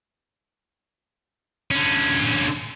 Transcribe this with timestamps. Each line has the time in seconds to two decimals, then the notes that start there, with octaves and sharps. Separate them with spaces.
1.71 D3 C#4